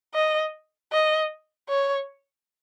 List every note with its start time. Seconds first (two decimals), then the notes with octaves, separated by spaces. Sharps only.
0.15 D#5
0.92 D#5
1.69 C#5